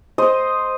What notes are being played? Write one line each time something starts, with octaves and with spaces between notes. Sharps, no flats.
C5 D#5